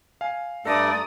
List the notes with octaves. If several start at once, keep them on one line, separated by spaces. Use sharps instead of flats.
F5 G#5
G2 A3 A4 D5 A#5 D#6 A#6